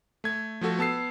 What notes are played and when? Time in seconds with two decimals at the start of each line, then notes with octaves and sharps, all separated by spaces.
0.24 A3 G#6
0.61 F3 A3 F#4 A4
0.79 B3 A5 E6 C7